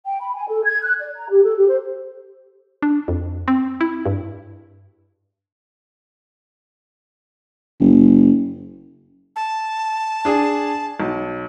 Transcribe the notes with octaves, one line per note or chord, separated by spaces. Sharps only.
G5
B5
G#5
A4
G#6
F#6
D5
A#5
G4
A4
G4
C5
D4
F2
C4
E4
G2
F#1
A5
D4 G#4 G#5
B1